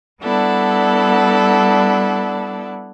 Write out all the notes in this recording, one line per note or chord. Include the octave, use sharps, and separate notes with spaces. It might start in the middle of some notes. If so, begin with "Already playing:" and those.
G3 B3 D4 E4 A4 F#5